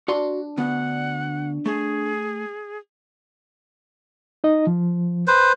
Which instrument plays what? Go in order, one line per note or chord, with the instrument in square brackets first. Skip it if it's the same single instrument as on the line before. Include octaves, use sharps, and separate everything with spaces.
[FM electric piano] D4 [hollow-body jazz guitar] F#4 F5 C6
[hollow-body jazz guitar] D2 B3 [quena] F#5
[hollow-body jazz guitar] A3 [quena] G#4
[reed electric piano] D#4 D#5
F3
[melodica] B4 C5